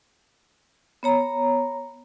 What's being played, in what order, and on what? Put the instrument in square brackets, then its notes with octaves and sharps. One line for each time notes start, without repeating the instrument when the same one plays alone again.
[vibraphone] B3 C#5 A#5